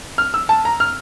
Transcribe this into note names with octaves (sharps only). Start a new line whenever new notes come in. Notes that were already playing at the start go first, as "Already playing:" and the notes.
F6
E6
A5
A#5
F6